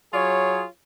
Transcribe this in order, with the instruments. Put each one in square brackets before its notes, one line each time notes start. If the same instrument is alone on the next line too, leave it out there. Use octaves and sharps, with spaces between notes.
[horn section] F#3 F4 G#4 C#5